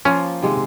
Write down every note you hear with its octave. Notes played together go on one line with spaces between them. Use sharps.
F3 A#3 C#4 F4
C3 D#3 G#3